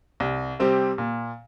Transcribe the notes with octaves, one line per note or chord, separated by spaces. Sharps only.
C2
C3 G3 C4 G4
A#2